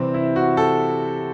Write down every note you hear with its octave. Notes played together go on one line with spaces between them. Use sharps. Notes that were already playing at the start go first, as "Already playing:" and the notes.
Already playing: C3 E3 G3 C4
E4
F#4
A4